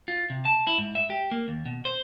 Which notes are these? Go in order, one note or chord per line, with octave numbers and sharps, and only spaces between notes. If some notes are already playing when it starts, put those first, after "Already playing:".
F4
C3
A5
E4
G#2
E5
G4
A#3
D#2
B2
C5